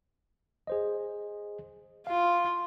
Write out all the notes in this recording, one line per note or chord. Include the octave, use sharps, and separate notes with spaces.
G#4 C5 D#5
F4 F5